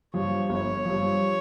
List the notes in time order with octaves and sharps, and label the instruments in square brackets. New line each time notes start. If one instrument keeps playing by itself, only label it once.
[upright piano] G2 F3 [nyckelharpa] C#5
[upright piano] G1 [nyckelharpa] C#5
[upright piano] G2 F3